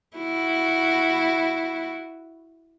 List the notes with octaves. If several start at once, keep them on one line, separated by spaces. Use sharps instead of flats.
E4 F#4